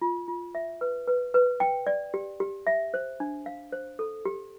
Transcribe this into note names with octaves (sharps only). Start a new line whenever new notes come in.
F4
F4
E5
B4
B4
B4
G5
D5
G4
G4
E5
C5
D4
F5
C5
A4
G4